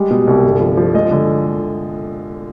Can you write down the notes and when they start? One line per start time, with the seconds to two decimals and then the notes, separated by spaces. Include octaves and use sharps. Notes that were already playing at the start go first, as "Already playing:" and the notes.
Already playing: G3 G#3
0.10 B2
0.27 C2
0.44 G1
0.60 F3
0.77 F3
0.94 G#3 D#5
1.11 D3